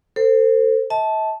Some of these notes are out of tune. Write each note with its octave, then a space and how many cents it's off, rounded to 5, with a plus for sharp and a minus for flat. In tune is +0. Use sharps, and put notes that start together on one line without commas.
A4 +35 C5 +0
E5 -45 A5 -10